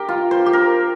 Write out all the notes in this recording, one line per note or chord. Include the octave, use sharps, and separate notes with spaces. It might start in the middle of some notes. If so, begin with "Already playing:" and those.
Already playing: G4 A#4
F4
C5
G4
A#4